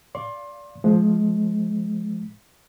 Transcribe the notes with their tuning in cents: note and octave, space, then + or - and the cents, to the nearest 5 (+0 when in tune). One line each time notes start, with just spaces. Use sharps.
D5 -20 F5 +0 C6 +25
F3 +0 G#3 +30